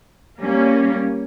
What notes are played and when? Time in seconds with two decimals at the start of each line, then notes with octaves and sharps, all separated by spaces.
0.38 G3 A#3 C#4